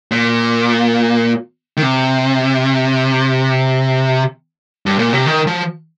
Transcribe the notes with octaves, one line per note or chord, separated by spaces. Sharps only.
A#2
D#3
C3
G2
A#2
C3
D#3
F3